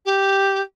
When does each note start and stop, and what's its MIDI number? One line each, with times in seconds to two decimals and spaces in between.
0.05 0.61 67